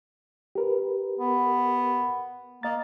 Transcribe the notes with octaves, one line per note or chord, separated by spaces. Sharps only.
G4 A#4 B4
B3
A#3 D#5 A6